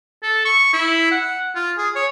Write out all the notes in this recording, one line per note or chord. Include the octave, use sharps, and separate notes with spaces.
A4
C#6
E4
F#5
F4
G#4
C#5